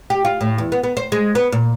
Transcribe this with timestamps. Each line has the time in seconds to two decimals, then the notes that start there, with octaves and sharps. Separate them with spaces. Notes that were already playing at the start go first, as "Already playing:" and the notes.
0.10 G4
0.25 F4
0.41 A2
0.58 E2
0.72 B3
0.83 B3
0.97 C5
1.12 G#3
1.35 B3
1.52 A#2